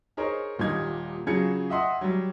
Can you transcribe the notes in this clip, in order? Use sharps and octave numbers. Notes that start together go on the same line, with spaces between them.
D#4 G#4 A#4 C5 C#5
D#1 A#2 G3 D#4 G#6
C#3 F#3 F4 G#4 G#6 C#7
D#5 E5 F#5 C6 D#6
F#3 G3